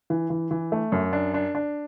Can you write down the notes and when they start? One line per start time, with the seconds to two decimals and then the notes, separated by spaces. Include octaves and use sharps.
0.10 E3
0.30 E3
0.51 E3
0.72 A3
0.92 F#2
1.13 D4
1.34 D4
1.55 D4